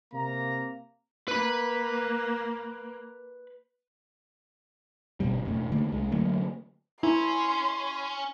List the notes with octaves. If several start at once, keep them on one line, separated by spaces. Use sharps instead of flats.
C3 A#3 A#5
A#3 B4 B5
G1 D#2 B2 G3
E1 A2
D3 A3 A#3
C2 G#3
D3 F#3 A3 A#3
C#4 E4 C6